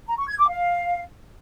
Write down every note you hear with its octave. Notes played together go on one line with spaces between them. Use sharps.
A#5
C#6
G#6
D6
F5